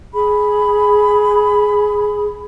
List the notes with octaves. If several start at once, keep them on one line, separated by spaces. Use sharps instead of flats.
G#4 B5